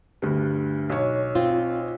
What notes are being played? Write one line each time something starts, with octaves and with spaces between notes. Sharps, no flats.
D2 G2
B1 C#5
C4 F4